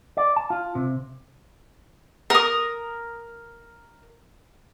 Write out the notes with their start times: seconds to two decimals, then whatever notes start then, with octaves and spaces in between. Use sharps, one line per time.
0.17 D5
0.36 A5
0.50 F4
0.75 C3
2.30 A#4 D#6